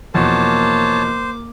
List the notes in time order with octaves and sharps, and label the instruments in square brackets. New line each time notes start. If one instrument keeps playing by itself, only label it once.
[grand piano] E2 B2 F3 [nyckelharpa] A#3 D6 [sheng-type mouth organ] C5 [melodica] C#5 A5